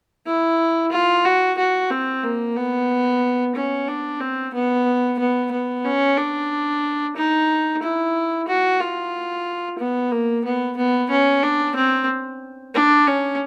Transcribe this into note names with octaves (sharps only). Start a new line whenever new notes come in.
E4
F4
F#4
F#4
C4
A#3
B3
C#4
D4
C4
B3
B3
B3
C#4
D4
D#4
E4
F#4
F4
B3
A#3
B3
B3
C#4
D4
C4
D4
C#4